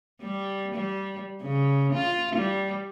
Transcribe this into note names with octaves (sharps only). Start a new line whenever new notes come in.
G3
G3
C#3
F4
G3